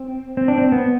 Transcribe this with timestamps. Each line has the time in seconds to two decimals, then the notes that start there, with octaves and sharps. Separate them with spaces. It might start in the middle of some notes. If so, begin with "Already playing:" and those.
Already playing: C4
0.37 C4
0.48 D4
0.58 C4
0.72 B3